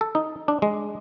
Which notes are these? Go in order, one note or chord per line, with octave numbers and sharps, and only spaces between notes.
A4
D#4
D4
G#3